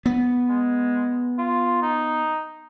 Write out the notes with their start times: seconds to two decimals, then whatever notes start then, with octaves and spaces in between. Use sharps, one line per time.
0.06 B3
0.49 G#3
1.38 F4
1.82 D#4